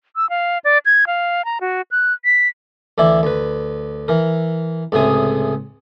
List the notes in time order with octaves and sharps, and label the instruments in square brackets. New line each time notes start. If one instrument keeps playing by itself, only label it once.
[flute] E6
F5
D5
G#6
F5
A#5
F#4
F#6
B6
[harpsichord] D2 E3 E4 D5
D2 B4
E3 A#4
C#2 A2 C3 G#4 D#6